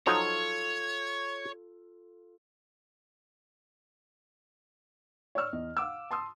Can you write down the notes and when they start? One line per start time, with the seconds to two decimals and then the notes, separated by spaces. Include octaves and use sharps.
0.07 F3 F#3 D#4 F4 A4 C#5 G#6
5.35 C#5 D5 C#6 E6 F6
5.53 E2 D#5
5.77 F5 F#5 D6 E6
6.11 A5 C6 D#6 E6